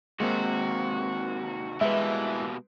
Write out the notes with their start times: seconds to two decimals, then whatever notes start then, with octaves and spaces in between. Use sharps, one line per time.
0.20 D#2 C3 G#3 A#3 C4 F#4
1.81 B2 E3 G3 G#3 A#3 B4 E5